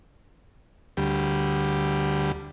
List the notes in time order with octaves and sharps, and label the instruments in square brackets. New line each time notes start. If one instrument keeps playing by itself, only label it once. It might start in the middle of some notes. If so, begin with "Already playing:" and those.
[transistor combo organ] D2 G3